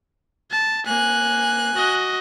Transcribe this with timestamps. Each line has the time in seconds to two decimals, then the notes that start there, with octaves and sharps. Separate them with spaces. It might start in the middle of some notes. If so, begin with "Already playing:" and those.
0.51 A5
0.87 A#3 G#5 F#6
1.75 F#4 D#5